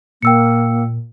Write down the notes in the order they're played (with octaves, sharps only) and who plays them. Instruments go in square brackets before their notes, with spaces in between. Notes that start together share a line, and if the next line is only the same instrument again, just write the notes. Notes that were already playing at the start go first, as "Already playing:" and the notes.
[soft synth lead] A#2 [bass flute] A#3 [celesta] G5 E6 C#7